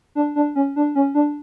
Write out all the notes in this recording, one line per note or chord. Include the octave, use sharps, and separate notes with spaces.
D4
D4
C#4
D4
C#4
D4